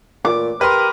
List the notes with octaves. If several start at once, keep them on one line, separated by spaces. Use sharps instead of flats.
A#2 D6
G4 A#4 B4 C6